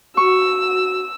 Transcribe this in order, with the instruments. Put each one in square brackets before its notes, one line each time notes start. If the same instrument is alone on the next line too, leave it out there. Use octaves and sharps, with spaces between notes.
[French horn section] F#4 [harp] C#6 [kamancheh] E6